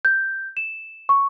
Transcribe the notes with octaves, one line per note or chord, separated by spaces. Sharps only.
G6
E7
C#6